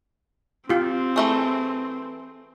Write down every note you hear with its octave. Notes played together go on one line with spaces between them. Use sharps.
C4 F4 G4
E3 A3 G#4